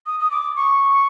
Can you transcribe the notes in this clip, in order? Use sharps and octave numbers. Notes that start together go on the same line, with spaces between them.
D#6
D#6
D6
C#6